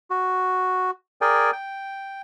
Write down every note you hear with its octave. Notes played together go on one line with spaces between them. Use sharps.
F#4
G#4 A#4 D5 G5 G#5
G5